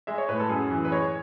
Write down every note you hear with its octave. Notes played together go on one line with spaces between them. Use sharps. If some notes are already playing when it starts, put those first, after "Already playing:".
G#3 E5
C#5
A2 B4
A4
F#2 G#4
E3
B4
G#3 C#5